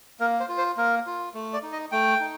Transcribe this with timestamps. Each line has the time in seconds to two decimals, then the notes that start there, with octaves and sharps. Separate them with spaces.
0.20 A#3 A#4
0.40 C5
0.49 F4
0.58 C5
0.77 A#3 A#4
1.06 F4
1.34 A3
1.53 D5
1.63 D#4
1.72 D#5
1.92 A3 G5
2.20 D#4